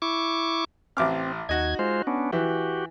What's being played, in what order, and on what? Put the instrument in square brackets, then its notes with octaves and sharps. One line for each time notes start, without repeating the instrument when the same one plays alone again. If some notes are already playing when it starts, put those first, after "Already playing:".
[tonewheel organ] E4 C#6 D6
[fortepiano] A1 D6 F6 [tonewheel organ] C4
[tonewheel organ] D#2 G#6 [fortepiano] D#4 F#4
[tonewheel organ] G#3 F4 C5
B3 C#4 D4
[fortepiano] E3 [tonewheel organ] F#4 G4